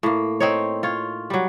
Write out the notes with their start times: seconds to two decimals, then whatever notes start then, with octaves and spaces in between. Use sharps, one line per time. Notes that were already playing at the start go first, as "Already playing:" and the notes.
0.03 A2 A#3
0.40 C4 D#4 C#5
0.83 F4 C#5
1.30 F#3 G3